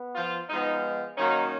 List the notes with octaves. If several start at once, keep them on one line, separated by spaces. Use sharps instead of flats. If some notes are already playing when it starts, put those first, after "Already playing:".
Already playing: B3
F3 F4
F3 G#3 B3 D#4
D#3 F#3 A#3 C#4 D#4